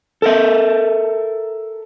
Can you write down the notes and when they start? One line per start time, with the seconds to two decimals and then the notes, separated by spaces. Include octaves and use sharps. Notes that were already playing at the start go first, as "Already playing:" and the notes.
0.22 A4 A#4 E5